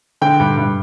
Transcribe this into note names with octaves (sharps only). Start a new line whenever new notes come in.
D3 G5
G2
G2